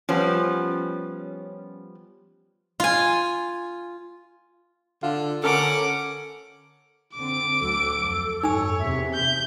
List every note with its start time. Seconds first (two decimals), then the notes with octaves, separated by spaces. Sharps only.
0.09 F3 G3 B3 C#4
2.80 F4 G#5
5.03 D3 F4
5.44 D3 C#4 A4 A#4 F#5 D6
7.16 D3 C4 D6 D7
7.60 D2 F#3 A4
8.00 F2
8.43 G#1 F#2 D#4 C#5 G#5 E6
8.79 E2 C3 E5
9.14 G6